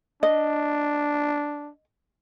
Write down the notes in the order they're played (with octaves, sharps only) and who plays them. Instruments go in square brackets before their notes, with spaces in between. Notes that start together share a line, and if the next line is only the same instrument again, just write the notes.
[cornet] D4 [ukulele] D#5